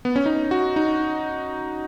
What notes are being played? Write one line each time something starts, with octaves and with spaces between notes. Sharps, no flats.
B3
C#4
D#4
F#4
D#4